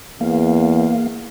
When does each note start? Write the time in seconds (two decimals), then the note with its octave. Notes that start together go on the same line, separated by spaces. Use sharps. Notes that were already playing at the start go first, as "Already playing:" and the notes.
0.21 E2 A#3 F5